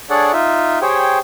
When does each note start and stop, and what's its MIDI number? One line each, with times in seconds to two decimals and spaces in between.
0.10 0.32 62
0.10 0.32 68
0.10 0.32 69
0.10 0.32 73
0.10 0.32 74
0.10 0.32 78
0.33 0.79 63
0.33 0.79 65
0.33 0.79 76
0.82 1.19 67
0.82 1.19 68
0.82 1.19 72
0.82 1.19 73
0.82 1.19 79